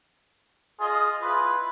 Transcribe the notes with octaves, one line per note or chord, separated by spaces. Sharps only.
F4 G#4 D#5
E4 F4 B4